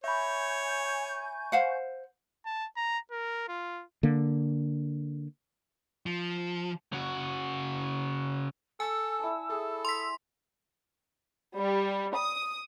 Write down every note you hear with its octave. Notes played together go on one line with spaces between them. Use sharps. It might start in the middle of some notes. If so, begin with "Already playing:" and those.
C#5 E5 G#5 B5 C#6 G6
C5 F5 F#5
A5
A#5
A#4
F4
D3 A#3
F3
C#3 F#4
A4 G#5 E6
E4 D5 A5
G#4 A4
C6 B6
G3
D#6